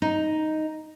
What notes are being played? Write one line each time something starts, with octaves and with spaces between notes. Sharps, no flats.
D#4